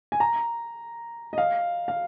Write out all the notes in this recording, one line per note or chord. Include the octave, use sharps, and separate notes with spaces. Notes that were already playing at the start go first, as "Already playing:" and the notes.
G#5
A#5
D#5
F5
F5